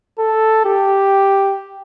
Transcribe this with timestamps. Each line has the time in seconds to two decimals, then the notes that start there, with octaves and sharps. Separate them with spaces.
0.19 A4
0.65 G4